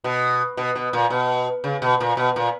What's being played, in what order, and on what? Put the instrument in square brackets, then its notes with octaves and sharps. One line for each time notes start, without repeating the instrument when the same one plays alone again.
[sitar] B2
B2
B2
A#2
B2
C#3
B2
A#2
B2
A#2